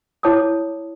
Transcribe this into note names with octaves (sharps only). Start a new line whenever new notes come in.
E4 C#5 A5 D6 D#6